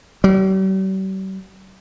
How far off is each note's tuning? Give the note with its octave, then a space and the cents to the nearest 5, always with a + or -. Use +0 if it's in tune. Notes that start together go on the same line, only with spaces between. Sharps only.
G3 -45